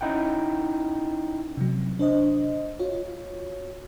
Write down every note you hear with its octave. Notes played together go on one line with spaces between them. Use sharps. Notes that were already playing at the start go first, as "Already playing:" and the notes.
C#4 D#4 E4 F#5 G5
C3 F#3
D4 C5 D#5
F4 F#4 C#5